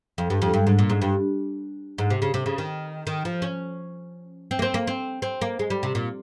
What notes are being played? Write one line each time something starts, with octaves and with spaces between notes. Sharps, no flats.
F2
G2
F2
G2
G#2
A#2
G#2
G2
G#2
C3
C#3
C3
C#3
D#3
D#3
F3
C#4
C4
A#3
C4
A#3
C4
C4
A#3
G#3
G3
C3
A#2